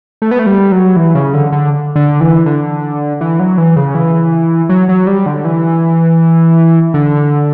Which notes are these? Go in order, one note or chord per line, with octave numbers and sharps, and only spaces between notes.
A3
B3
A3
G3
F#3
E3
C#3
D3
D3
D3
E3
D3
E3
F#3
E3
C#3
E3
F#3
F#3
G3
D3
E3
D3